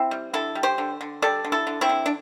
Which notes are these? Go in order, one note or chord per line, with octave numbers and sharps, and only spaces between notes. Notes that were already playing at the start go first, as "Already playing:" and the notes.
Already playing: C4 E4
G3
D3 E4 A4
G3
G4 C5
D3
D3
G3 A4 D5
D3
E4 A4
D3
C4 E4
D3
D4